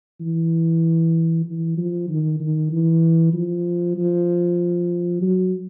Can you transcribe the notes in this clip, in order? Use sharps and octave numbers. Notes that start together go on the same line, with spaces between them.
E3
E3
F3
D#3
D#3
E3
F3
F3
F#3